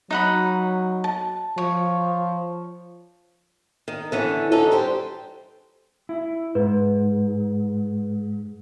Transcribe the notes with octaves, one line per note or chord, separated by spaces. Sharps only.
F#3 D#4 F#5 B5
A5
F3 C#5
D#3
D3 E3 C#4
C#4 D#4 F#4 A4
G3 G4 C5
E4
G#2 B4